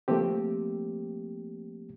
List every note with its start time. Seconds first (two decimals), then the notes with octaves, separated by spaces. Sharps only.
0.08 F3 A3 A#3 C4 G4